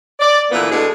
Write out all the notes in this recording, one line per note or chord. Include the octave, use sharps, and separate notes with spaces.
D5
A#2 D3 E3 A#3 B3
B2 G#3 A3 D4 G#4